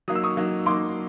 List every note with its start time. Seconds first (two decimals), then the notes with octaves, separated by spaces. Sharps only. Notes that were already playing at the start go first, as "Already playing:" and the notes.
0.08 F#3 A#3 D#4 D#6
0.15 E6
0.23 C#6 D#6
0.37 F#3 A#3 D#4
0.66 F#3 A#3 D#4 C6 D6